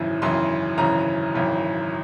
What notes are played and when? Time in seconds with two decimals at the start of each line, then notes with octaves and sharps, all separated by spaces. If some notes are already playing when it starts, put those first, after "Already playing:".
Already playing: G#1 F#2 C#3 E3
0.22 G#1 F#2 C#3 E3 C6
0.78 G#1 F#2 C#3 E3 A#5
1.34 G#1 F#2 C#3 E3